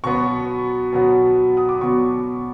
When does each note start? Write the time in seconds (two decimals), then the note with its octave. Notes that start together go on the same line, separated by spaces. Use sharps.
0.04 B2 F#3 B3 C#6
0.92 B2 F#3 B3
1.57 D#6
1.69 D6
1.81 B2 F#3 B3 C#6